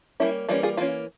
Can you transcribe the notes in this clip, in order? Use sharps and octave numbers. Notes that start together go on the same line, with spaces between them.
G3 A#3 C#4 E4
E3 G3 A#3 C#4 F4
F4 G#4
E3 A#3 C#4 F4